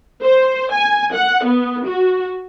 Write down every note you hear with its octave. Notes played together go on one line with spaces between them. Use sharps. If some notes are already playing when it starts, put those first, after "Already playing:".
C5
G#5
F#5
B3
F#4